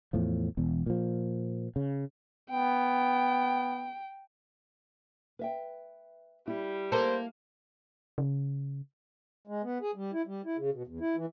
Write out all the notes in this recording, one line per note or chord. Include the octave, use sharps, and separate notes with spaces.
E2 A2 F3
E1 E2
A#2 F3
C#3
B3 G5
B4 E5 G5
G3 E4
A#3 A4 C5
C#3
G#3
B3
G#4
G3
E4
G3
E4
C#3
B2
E2
E4
E3